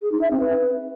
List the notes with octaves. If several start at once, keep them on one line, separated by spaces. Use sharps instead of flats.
G#4
D#4
E5
C4
B4